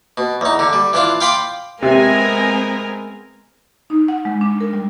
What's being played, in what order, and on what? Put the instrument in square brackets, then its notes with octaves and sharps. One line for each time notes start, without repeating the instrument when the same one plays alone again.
[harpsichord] B2
E2 D#4
D3
G3
E3 D4 F4
F5 G5 B5 C6 D6 D#6
[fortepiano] C3 [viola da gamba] G#3 B3 A#4 [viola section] C4 G#5
[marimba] D#4
F#5
G#3
D4
A#4
G3